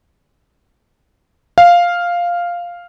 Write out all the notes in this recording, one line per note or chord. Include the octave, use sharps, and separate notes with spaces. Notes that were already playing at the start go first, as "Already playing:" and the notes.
F5